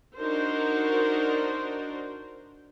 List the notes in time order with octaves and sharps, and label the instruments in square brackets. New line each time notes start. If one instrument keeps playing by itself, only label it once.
[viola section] D4 D#4 F#4 A#4 C5